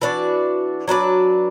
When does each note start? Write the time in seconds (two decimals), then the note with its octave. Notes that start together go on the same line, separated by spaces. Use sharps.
0.02 E3 D4 F#4 D5
0.88 F#3 D4 B4 D5